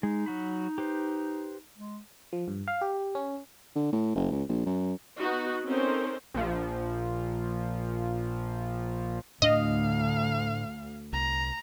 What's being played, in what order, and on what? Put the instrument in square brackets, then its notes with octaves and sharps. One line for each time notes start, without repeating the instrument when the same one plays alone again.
[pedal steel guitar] G#3 [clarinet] D#4
[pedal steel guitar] F#3 F#4 B5
G4 B4 C5
[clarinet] G#3
[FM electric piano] F3
G2
F5
G4
C#4
[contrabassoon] D3
A2
F#1
C#2
A#1
F#2
[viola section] B3 D#4 F#4
C4 C#4 D#4 A4 A#4 C5
[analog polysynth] A#1 F3
[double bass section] D2 [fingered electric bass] A2 D4 [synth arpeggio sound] D#5 [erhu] F5
[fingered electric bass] C2 [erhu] A#5